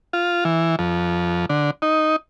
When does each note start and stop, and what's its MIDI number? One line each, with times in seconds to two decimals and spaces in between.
0.13 0.44 65
0.45 0.76 52
0.79 1.46 41
1.49 1.71 50
1.82 2.16 63